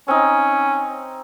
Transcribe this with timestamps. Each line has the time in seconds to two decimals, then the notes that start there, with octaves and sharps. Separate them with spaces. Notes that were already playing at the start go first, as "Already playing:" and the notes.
0.08 C4 C#4 D#4